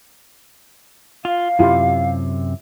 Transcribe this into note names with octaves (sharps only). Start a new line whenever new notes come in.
F4 F5
F#2 C3 E4 F4 G4